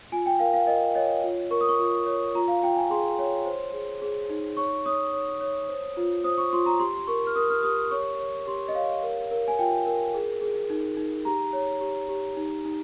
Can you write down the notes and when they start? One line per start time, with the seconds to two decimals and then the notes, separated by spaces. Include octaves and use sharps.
0.12 F4 G#5
0.26 G5
0.39 A#4 F5
0.54 F5
0.67 A#4 D#5
0.95 C#5 D#5
1.24 F4
1.51 A#4 C#6
1.61 D#6
1.69 C#6
1.79 F4
2.06 C#5
2.35 F4 A#5
2.48 F5
2.63 F4 G5
2.76 G#5
2.90 G#4 C6
3.19 C#5
3.45 C5
3.73 G#4
4.02 G#4
4.29 D#4
4.57 C#5 C#6
4.86 C#5 D#6
5.13 C#5
5.41 C#5
5.68 C5
5.97 F4
6.24 C5 D#6
6.38 C#6
6.53 F4 C6
6.66 A#5
6.80 G4 C6
6.97 C6
7.07 A#4 C#6
7.27 F6
7.35 A#4 D#6
7.50 F6
7.63 G4 D#6
7.91 C#5 C#6
8.20 C#5
8.47 G4 C6
8.68 D#5
8.75 C#5 F5
9.03 A#4
9.31 A#4
9.48 G#5
9.59 F4 G5
9.86 A#4
10.14 G#4
10.41 G#4
10.70 D#4
10.97 D#4
11.25 G4 A#5
11.53 C#5
11.81 G4
12.09 G4
12.37 D#4
12.65 D#4